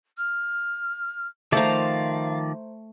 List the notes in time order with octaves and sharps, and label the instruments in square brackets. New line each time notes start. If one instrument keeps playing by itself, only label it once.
[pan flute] F6
[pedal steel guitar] D#3 F3 D5 [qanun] A3 C5 A#5 [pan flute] F5